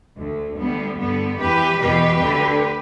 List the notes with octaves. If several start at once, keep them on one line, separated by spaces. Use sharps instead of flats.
D2 D3
D2 D3 G3 B3
G2 D3 G3 B3
E2 E3 G4 B4
E2 B2 G4 B4
D2 D3